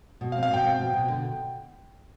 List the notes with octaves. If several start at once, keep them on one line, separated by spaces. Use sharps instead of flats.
B2
F5
C4
F5
B2 G5
C4
B2
B2
D3